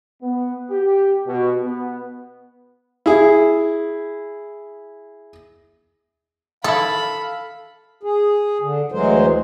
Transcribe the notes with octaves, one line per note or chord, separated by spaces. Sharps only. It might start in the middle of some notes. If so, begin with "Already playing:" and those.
B3
G4
B2
B3
E4 G#4
D#3 E4 A4 F5 B5
G#4
D3
D2 E3 F#3 G#3 C5